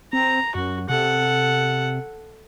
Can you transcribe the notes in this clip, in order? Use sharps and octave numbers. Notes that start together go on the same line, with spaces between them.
C4 A#5
F#2 F#4
C3 A4 F#5